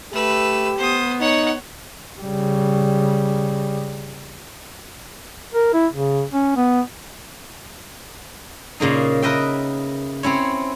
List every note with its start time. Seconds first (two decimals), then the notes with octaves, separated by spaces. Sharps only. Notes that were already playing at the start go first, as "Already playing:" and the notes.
0.13 A3 G4 B4 E6
0.78 B3 C5 D#6
1.21 D#4 C#5 F#5
2.21 C#3 G3
5.54 A#4
5.74 E4
5.93 C#3
6.33 C#4
6.57 B3
8.80 A#2 C#3 A#3 D#4
9.22 A#4 B4 D#5 E5 G5
10.23 C4 C#4 E4 C#5